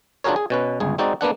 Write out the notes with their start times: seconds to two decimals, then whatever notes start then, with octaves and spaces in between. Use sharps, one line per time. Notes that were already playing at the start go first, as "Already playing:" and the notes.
0.24 D4 F4 F#4 G#4 A#4 C#5
0.36 G#4
0.50 B2 C#4 B4
0.80 G1 C#2 G#4
0.98 G#3 C4 D#4 F#4 D5
1.21 A#3 B3 D4 F#5